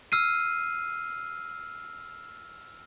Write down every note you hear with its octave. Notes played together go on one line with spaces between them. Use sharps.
E6 F6 C7 D#7